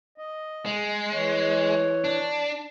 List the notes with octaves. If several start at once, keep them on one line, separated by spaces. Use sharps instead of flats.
D#5
G#3
E3 C#5
D4